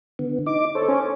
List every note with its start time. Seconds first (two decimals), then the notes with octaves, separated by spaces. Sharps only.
0.19 D3 B3
0.46 D#4 D6
0.75 A4 C5 C#5
0.89 C#4